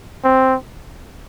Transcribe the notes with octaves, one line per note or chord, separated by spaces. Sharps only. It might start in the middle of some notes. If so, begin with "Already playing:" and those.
C4